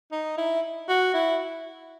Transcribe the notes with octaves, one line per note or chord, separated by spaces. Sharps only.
D#4
E4
F#4
E4